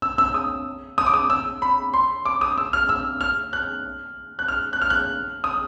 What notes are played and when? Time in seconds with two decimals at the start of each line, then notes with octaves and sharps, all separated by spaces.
0.02 E6
0.18 E6
0.34 D#6
0.98 D#6
1.06 D6
1.14 D#6
1.30 E6
1.62 B5
1.94 C6
2.25 D6
2.41 D#6
2.58 E6
2.73 F6
2.89 E6
3.21 F6
3.53 F#6
4.39 F#6
4.48 F6
4.73 F#6
4.82 F6
4.90 F#6
5.44 D#6